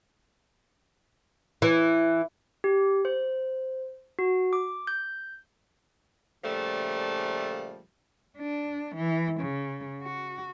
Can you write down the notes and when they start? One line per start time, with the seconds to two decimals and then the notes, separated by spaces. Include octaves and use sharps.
1.62 E3
2.64 G4
3.05 C5
4.19 F#4
4.53 D6
4.87 G6
6.45 A#2 C#3 F3 G3 A3
8.38 D4
8.96 E3
9.41 C#3
10.03 F#4